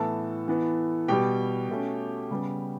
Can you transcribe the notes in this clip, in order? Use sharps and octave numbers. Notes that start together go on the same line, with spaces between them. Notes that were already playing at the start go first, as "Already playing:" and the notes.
Already playing: A2 E3 B3 A4 A5
E3 B3
B2 G3 B3 G4 G5
B2 A3 C#4
C#3 G3 B3